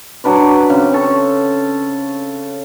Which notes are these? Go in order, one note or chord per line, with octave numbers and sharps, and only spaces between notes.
F#3 D4 B4 D5
C#3 C4
A4 C#5 A5